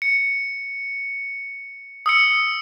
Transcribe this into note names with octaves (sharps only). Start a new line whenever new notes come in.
C#7
D#6 E6 C#7